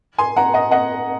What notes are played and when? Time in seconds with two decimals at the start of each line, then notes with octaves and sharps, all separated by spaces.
0.18 G#5 C6
0.36 F#5 A#5
0.54 D#5 F#5
0.71 D#5 F#5